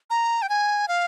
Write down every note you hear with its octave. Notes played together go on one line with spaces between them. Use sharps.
A#5
G5
G#5
F5